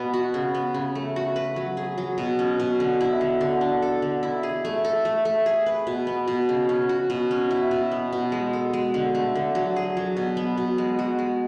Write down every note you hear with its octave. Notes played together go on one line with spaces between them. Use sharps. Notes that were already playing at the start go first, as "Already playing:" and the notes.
Already playing: B2 B3
F#4
C#3
B3
C#3
A3
F#4
B4
F#3
G#4
F#3
B2
C#4
B2
D3
E4
D3
D3
D4
A4
D3
E4
G#4
A3
A4
A3
A3
G#4
B4
B2
B3
B2
C#3
C#4
F#4
B2
C#4
E4
B2
B3
B2
G#3
A4
G#3
D3
A3
D3
F#3
G#4
F#3
B2
B3
B2
G#3
F#4
G#3